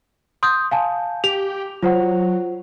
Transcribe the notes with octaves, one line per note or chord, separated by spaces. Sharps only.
C6 D#6 G6
F5 G#5 A5
G4 F7
F#3 F4 C5 F#5